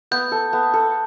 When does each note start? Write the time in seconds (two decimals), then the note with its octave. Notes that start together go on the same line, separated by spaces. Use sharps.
0.11 B3 G6
0.32 A4
0.53 B3
0.74 A4